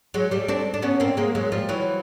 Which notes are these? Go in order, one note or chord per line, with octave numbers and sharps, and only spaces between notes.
F#3 G#3
G3 A3
C4 D4
D4
B3 C#4
A#3 C4
G#3 A#3
F#3 G#3
F3 G3
E3 F#3